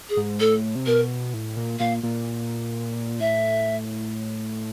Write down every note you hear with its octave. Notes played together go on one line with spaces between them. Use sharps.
G#4
G#2
A2 A4
C3
B2 A#4
A2
A#2
A#2 F5
A#2
A2 E5